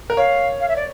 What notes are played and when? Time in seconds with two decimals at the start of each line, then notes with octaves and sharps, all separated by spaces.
0.10 A#4
0.17 C#5 F5
0.60 F5
0.68 E5
0.76 D5